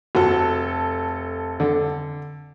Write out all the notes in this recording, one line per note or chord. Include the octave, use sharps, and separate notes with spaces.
F1 F#4 A4
D3